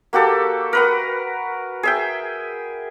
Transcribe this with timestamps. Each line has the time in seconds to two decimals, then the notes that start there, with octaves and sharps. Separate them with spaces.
0.13 A#3 F#4 G4 A4
0.73 A#4 B4 F#5
1.83 G#4 E5 G5